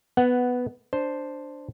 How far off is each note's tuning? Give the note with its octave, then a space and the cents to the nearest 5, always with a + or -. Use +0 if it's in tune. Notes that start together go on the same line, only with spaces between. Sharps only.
B3 +5 F#5 +0
D4 +0 C5 +0